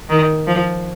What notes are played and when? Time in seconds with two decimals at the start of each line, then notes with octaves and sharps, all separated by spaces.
0.10 D#3
0.47 F3